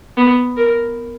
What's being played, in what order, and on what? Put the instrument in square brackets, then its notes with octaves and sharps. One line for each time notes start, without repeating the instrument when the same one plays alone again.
[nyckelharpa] B3
A#4